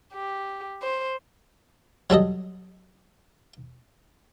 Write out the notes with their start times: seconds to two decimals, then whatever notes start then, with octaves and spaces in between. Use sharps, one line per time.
0.13 G4
0.82 C5
2.10 F#3 G3 A4 D#5